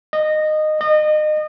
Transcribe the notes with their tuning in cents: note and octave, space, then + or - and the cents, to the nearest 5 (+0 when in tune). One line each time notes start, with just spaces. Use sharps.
D#5 -15
D#5 -30